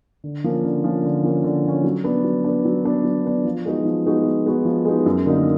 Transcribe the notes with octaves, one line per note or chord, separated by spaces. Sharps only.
D3
F3 A#3 C#4
D3
F3 A#3 C#4
D3
F3 A#3 C#4
D3
F3 A#3 C#4
F#3
B3 D4
F#3
B3 D4
F#3
B3 D4
F#3
B3 D4
F3
G#3 B3 D#4 F#4
F3
G#3 B3 D#4 F#4
F3
G#3 B3 D#4 F#4
F3
G#3 B3 D#4 F#4
F#2
D3 F#3 A#3 D#4